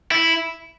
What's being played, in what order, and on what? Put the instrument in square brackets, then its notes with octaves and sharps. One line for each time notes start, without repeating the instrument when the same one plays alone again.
[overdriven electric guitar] E4